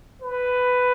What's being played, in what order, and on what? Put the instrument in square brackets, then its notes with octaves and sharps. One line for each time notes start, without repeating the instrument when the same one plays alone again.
[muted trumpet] B4